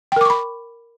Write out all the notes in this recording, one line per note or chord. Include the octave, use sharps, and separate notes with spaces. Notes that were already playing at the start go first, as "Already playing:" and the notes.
A#4 G5 B5 C#6 D6